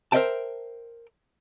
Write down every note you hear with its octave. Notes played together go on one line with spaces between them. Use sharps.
A#4 C5 D#5 E5 G5 A5